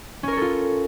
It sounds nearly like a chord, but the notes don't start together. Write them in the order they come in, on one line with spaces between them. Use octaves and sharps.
C#4 A#4 C#5 A4 F4